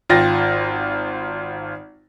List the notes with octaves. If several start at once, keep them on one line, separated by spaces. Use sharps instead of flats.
G#1 F4 G5 A6 A#6